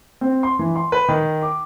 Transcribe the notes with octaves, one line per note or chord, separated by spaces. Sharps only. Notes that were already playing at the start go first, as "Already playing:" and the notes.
C4
C6
E3
C6
B4
D#3
D6